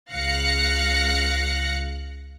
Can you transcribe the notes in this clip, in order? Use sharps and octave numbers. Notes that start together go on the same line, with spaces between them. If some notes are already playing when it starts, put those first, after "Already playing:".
C#2 F5 F#6 A#6 C#7